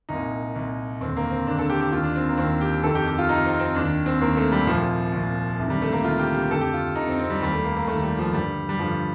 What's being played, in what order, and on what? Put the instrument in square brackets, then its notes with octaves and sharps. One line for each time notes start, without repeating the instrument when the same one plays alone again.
[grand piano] C2 A#2 D#4
C2 A#2
D#2 D3 C4
A#3
C4
D#2 D3 D4
A4
G4
G4
D#2 D#3 F4
D4
C4
A#3
D#2 D#3 C4
G4
F2 C3 D#3 A4
G4
G4
F4
F2 C3 D#3 D#4
C4
C4
D#2 D#3 D4
C4
D#2 D#3 A#3
A3
G3
C2 A#2 F3
C2 A#2
D2 C3 D#3
G3
A3
A#3
D2 C3 D#3 F4
G4
G4
F2 D3 A4
G4
F4
F2 D3 D#4
C4
C4
G3
D#2 D#3 G3
A3
A#3
A#3
D#2 D#3 A3
G3
F3
G2 D3 G3
G3
G2 D3 F3